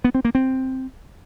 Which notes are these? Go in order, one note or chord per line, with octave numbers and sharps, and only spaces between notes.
B3
C4
A#3
C4